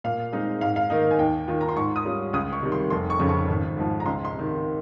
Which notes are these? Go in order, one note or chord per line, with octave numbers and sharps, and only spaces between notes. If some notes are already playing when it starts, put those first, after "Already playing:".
A#2 F5
G#3 C4 D#4
G#2 F5
F5
D#3 A#3 D#4
G#5
D#2 G5
D#3 A#3 F4
A#5
C6
G#2 C#6
D#6
G3 C#4 F4
C#2 D#6
C#6
C3 D#3 G3
C6
F1 C6
C#6
F2 C#3
C#6
G#1
G#2 F3
A#5
C#2 C6
C6
C3 D#3